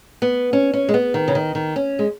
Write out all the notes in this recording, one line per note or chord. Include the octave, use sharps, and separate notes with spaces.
B3
C#4
C#4
G#3
B3
D#3
C#3
D#3
D#3
C#4
G#3